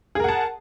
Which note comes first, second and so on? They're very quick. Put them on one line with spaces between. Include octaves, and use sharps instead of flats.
G#4 A#4 F#5 A5